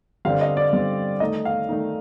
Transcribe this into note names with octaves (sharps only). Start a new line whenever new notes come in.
G2 D3 G3 C4 F5
D#5
D5
G2 D3 G3 C4
D#3 A3 D#4 D#5
F5
D#3 A3 D#4